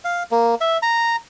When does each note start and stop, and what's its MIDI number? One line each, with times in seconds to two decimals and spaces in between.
0.04 0.23 77
0.31 0.55 58
0.61 0.78 76
0.82 1.16 82